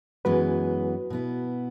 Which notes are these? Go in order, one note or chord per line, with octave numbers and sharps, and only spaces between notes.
F#2 E3 G#3 B3 F#4 B4
B2 B3 E4